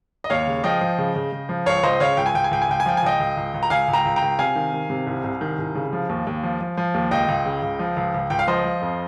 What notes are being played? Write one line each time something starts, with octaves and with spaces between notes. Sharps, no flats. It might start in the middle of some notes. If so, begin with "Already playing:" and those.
D#5
D#2 C#5 F5
C#3
F3 D#5 G5
F3
C#3
C#3
C#3
F3
C#2 C#5 F5
C#2 C5 D#5
C#3 C#5 F5
C#2 G5
G#5
C#2 G5
G#5
C#2 G5
G#5
C#2 G5
G#5
F3 G5
G#5
C#2 D#5 G5
C#2
C#2
C#2
A#5
C#2 F5 G#5
C#2
G5 A#5
C#2
G5 A#5
C#2
C3 F5 G#5
D#3
D#3
C3
C2
C2
D#3
C2
C#3
F3
D#2
D#2
F3
F3
F3
D#2
C#2 D#5 G5
C#2
C#3
C#2
F3
C#2
C#2
C#2 G5
F5
F3 C5 D#5
F3
F2